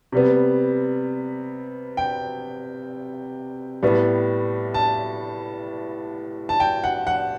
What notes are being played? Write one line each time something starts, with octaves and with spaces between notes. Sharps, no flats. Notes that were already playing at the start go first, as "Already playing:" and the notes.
C3 G3 B3
G5
A2 G3 B3
A5
A5
G5
F#5
F#5